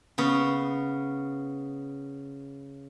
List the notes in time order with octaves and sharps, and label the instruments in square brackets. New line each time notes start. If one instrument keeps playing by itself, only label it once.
[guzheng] C#3 B3